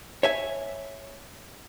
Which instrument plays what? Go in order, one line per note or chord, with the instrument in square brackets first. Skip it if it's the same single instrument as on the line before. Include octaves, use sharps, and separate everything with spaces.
[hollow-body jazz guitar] C#5 E5 G#5